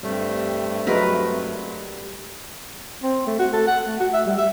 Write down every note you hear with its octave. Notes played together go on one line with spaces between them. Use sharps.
G2 G3 A3 C4
F#3 G#3 A#4 B4
C4
A3
F#4
A4
F#5
A3
F#4
E5
G3
E5